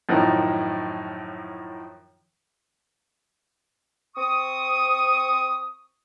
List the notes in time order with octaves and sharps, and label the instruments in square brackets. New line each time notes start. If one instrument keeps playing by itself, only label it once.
[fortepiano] F#2 A2 D#3 F3
[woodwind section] C4 C#6 D#6